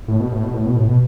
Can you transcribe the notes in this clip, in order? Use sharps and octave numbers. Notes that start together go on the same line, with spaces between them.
A2
B2
A2
B2
A2
B2
A2
B2